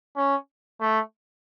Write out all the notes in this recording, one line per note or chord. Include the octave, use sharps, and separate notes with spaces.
C#4
A3